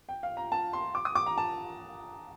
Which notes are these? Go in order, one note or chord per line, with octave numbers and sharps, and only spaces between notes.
G5
F5
A#5
A5
C6
D6
D#6
D6
A#5
A5